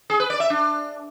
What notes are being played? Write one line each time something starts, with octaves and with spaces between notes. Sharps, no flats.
G#4
B4
D5
E5
D4